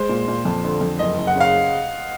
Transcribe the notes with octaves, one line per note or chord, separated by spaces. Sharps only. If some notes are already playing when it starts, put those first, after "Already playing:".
Already playing: G#3 C5
A#2
A#2
F2
D3
F2
F#1 D#5
F#1
F#5
C#3 F5